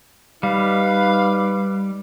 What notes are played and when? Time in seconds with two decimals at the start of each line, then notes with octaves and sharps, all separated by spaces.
0.43 G3 D#4 B4 F5